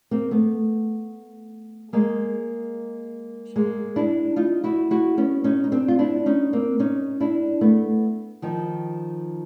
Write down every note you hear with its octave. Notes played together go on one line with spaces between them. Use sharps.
A#3 C4
A3 B3
G#3 A#3
G#3 A#3
D4 E4
D#4 F4
E4 F#4
E4 F#4
B3 C#4
C#4 D#4
D#4
C4 D4
F4
D4 E4
C#4 D#4
A#3 C4
C#4 D#4
D4 E4
A3 B3
D#3 F3